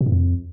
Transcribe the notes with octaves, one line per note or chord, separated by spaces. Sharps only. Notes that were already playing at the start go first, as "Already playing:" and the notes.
B2
G#2
F2